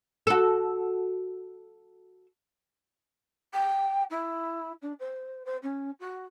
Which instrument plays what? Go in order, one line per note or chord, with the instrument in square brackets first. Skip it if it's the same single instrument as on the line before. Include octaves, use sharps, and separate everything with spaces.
[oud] F#4 A4
[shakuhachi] G5
E4
D4
C5
C5
C#4
F#4